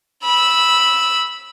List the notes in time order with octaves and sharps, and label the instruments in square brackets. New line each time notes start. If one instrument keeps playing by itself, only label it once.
[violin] B5 E6